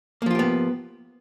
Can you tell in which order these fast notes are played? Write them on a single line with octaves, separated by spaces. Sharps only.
A#3 F3 F4 G4 B3